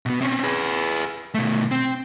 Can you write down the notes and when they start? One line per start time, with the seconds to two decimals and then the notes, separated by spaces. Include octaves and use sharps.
0.06 B2 B3
0.20 C4 C#4
0.43 G#4 B4
1.34 B2 A3
1.71 C4